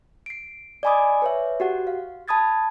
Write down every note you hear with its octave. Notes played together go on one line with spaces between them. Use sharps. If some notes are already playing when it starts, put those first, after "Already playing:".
C7 D7
D5 D#5 G#5 B5 D6 D#6
B4 C#5 E5
F#4 G4 F#5
F5
A5 B5 D#6 G#6 A6